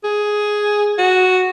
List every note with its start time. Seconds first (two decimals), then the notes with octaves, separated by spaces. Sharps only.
0.04 G#4
0.98 F#4